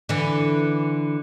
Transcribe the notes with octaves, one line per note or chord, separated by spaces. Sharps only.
D3 E3